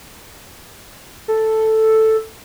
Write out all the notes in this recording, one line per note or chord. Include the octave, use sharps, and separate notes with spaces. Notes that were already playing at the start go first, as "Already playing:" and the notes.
A4